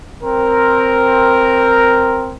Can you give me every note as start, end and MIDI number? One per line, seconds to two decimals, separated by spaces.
0.22 2.35 60
0.22 2.35 70